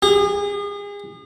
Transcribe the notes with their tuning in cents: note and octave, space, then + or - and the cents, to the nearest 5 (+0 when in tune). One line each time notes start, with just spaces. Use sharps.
G#4 -35